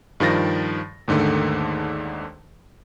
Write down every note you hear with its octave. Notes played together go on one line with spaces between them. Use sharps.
G2 D#3 F3 A6 A#6
D#2 G#2 D3 D#3 A3